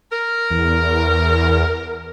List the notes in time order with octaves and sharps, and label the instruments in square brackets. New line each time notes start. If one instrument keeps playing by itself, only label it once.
[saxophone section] A#4
[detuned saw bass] E2